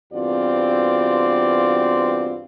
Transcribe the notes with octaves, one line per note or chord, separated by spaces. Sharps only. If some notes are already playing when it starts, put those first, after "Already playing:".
E2 G2 C4 F4 F#4 D5